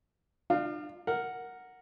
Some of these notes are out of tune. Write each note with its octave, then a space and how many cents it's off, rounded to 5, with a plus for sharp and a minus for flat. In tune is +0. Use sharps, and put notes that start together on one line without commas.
D4 +40 F4 +0
A#4 +0 F#5 -5